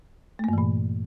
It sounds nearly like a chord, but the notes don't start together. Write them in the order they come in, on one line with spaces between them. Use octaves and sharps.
A3 A#3 G2 E3 A#2